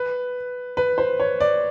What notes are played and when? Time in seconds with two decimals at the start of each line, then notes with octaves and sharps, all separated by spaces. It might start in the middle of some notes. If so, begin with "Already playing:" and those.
Already playing: B4
0.77 B4
0.98 C5
1.20 C#5
1.40 D5